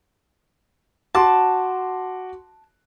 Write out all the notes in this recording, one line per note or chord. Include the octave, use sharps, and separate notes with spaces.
F#4 A5 C6 D6